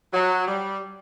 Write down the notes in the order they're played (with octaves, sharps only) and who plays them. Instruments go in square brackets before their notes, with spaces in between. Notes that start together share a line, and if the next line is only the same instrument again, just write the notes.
[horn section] F#3
G3